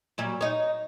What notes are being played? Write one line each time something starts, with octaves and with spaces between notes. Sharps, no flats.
A#2 F#3 G3
D#4 C#5